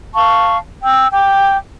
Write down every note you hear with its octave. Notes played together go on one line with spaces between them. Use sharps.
F5 A5 C#6
G5 E6
G5 D6